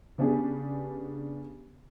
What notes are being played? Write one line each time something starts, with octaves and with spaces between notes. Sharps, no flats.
C#3 B3 D4 G4 G#4